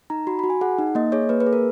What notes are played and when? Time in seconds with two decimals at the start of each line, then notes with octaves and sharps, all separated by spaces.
0.10 D#4 A#5
0.27 F#4 B5
0.39 F#4 B5
0.50 G#5
0.61 G#4 F#5
0.78 D#4
0.95 A#3 D#5
1.12 G#4 C#5
1.29 A#3 B4
1.40 B4
1.46 G#4
1.53 A#4